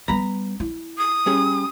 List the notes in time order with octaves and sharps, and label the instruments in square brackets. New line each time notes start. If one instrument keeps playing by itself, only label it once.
[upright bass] G3 B3 [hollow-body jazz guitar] A#5 B5
[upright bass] E4
[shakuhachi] D#6
[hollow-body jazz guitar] G3 C#4 G#4